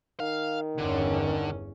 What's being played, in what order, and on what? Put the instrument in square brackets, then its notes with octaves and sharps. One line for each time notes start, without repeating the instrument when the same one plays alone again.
[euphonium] D#3 [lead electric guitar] F5
[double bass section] G1 E2 C#4 [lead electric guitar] D3